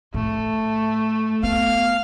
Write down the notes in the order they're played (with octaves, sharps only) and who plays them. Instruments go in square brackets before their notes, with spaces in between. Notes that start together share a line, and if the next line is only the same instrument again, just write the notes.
[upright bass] A2 [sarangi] A3
[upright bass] B3 [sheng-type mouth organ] F5 F6